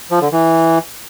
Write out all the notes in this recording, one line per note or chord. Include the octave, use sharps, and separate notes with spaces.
F3
D3
E3